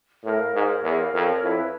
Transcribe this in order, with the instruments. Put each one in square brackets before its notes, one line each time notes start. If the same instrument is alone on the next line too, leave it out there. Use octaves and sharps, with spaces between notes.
[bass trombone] A2 [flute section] A#4
[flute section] F5
[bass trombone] G#2 [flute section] A#4
[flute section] C#5
[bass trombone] E2 [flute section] A#4
[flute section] F5
[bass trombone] F2 [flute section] A#4
[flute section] C#5
[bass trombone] F2 [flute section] E4
[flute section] B4